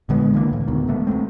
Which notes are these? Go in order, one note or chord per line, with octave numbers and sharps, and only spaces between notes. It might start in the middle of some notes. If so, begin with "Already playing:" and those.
A#1 D3 G#3 B3
D3 E3 F3 A#3
C#2 A2
D2 B2 D#3
E1 A3 B3
E1 G#2 A3 C4